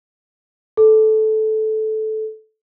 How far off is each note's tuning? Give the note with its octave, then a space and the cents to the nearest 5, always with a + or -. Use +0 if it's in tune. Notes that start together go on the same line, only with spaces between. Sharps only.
A4 -15